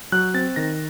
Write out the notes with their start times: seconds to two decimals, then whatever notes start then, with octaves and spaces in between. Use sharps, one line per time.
0.12 F#3 F#6
0.34 C4 A6
0.56 D#3 A#6